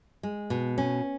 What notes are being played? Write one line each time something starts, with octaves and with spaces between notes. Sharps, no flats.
G#3
B2
C#4